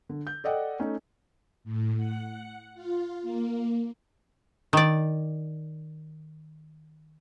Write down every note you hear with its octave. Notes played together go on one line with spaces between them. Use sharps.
D3
G6
A4 D5 D#5 F#5 G5
A3 C#4 D#4
A2
F#5
F4
A#3
D#3 D5